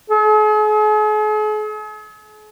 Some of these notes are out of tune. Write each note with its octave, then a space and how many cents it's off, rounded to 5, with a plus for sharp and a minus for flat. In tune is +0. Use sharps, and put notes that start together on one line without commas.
G#4 +45